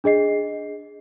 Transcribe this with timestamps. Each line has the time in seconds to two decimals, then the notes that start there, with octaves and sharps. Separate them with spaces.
0.04 D4 G#4 D#5 C7